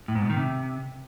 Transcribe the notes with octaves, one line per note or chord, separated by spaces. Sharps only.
A2
G#2
B2
D#3
C3